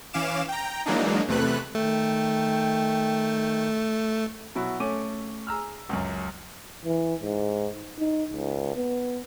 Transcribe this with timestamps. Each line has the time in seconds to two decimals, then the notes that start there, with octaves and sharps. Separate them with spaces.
0.13 E3 C#4 F5 D6 E7
0.48 G5 A#5
0.86 E3 F#3 G#3 A#3 D4 D#4
1.27 E2 C3 A3 B4 F#6
1.75 D#3 A3 G5
4.55 B2 F#3 E4 F#4
4.80 A3 C#4 D6 D#7
5.47 G#4 A#5 E6 F6
5.89 C#2 F#2
6.85 E3
7.23 G#2
7.99 D#4
8.34 C#2
8.76 B3